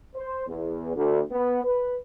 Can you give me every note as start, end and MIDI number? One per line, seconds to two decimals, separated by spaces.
0.16 0.47 72
0.48 0.95 40
0.96 1.21 38
1.31 1.60 59
1.65 1.96 71